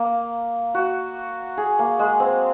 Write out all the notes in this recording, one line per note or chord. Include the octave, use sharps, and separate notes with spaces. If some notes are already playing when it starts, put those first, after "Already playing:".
Already playing: A#3
F#4
G#4
A#3
G#3
C4